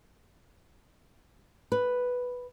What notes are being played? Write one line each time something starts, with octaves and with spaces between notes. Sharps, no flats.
B4